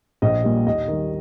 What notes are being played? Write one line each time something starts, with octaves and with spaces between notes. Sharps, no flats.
A#1 D#5
A#2 G3
D#2 D#5
D#3 G3